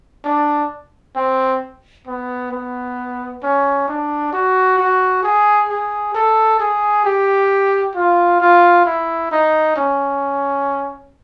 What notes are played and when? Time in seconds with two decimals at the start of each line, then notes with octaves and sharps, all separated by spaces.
0.25 D4
1.16 C4
2.07 B3
2.51 B3
3.43 C#4
3.88 D4
4.33 F#4
4.78 F#4
5.23 G#4
5.69 G#4
6.14 A4
6.60 G#4
7.05 G4
7.95 F4
8.40 F4
8.86 E4
9.31 D#4
9.76 C#4